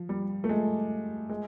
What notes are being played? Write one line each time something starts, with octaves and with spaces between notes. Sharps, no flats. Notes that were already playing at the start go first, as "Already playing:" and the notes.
Already playing: F3
G3
A3
G#3
G#3